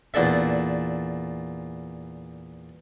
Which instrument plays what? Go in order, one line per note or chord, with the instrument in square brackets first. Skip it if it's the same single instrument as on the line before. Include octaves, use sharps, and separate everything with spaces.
[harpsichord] E2 A#2 D4 A4 E5